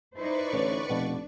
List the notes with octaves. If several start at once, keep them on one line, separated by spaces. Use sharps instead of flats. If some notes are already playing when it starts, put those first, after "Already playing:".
D#4 E4 B4 C5 D5 C#6
A1 D3 C#5
F1 B2 F3 D4